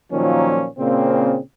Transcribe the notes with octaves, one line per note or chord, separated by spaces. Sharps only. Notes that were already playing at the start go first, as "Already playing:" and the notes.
A#2 D#3 F3 F#3 A#3 C#4
A#2 C#3 A#3 C4